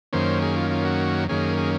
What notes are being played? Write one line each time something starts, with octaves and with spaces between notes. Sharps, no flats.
F#2 D#3 A#3 C#4 C5
G#4
F4
F4
F#4
F#2 D#3 A#3 C#4 G#4
G#4